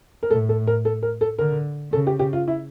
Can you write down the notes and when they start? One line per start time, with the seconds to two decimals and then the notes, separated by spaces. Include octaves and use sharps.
0.23 A#4
0.30 A2 A4
0.49 A4
0.67 A#4
0.85 A4
1.03 A#4
1.21 A4
1.38 D3 A#4
1.92 C#3 A4
2.07 G4
2.19 G4
2.33 F4
2.48 E4